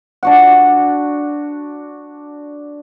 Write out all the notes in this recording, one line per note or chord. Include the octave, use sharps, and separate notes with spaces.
D4 F#4 F#5